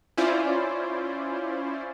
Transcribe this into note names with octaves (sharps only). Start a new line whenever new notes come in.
C#4 E4 F4 C5 D5